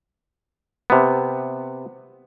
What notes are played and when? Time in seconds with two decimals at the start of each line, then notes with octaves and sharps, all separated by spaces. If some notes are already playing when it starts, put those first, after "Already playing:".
0.90 C3 B3